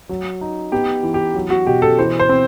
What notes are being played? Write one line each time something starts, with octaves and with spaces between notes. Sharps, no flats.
F#3
D#4
B3 G4
E3
G4
F#3
F#4
B2 G4
A4
E3 C5
C5
C4